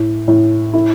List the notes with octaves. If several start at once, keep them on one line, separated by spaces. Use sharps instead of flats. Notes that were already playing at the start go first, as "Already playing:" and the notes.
Already playing: A2
A2
E4